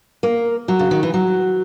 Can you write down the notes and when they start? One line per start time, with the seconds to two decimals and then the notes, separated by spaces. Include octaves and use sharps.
0.23 A#3
0.68 F#3
0.79 C#3
0.91 D#3
1.03 E3
1.14 F#3